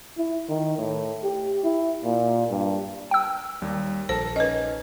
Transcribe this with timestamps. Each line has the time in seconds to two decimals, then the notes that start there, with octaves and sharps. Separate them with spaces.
0.18 E4
0.49 D#3
0.78 A2
1.24 G4
1.64 E4
2.04 A#2
2.50 G2
3.11 G5 E6
3.62 D#2 G3 A#3
4.09 A#1 A4 A#4 C5 A5
4.36 C#4 D#4 B4 D#5